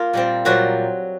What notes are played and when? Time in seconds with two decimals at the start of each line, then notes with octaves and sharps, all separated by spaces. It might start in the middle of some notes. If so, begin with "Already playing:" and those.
Already playing: A#3 F4
0.13 A#2 G3 C4
0.45 A#2 F#3 G3 C4 F#4